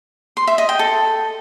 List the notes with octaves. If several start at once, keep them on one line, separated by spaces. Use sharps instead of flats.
C6
E5
D#5
G5
A4